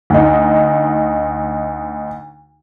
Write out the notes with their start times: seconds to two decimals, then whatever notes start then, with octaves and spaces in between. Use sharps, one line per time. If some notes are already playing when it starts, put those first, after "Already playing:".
0.10 D2 D#4